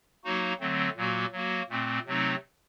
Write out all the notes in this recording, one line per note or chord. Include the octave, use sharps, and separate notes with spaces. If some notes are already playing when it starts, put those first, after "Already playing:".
F#3 A#3 D#4 F#4
D3 F#3 A3 C4
A#2 F#3 A#3 F#4
F#3 A#3 F#4
A#2 A3 C4
C3 F#3 A3 C4 D#4